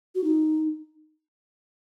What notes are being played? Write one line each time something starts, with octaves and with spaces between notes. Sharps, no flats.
F#4
D#4